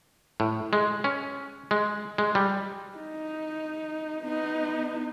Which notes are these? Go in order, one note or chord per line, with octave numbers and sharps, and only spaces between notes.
A2
G#3
C#4
G#3
G#3
G3
D#4
B3 D#4